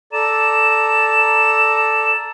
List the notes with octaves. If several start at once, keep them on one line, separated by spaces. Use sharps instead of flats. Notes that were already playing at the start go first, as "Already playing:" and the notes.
A4 D5 A#5 E7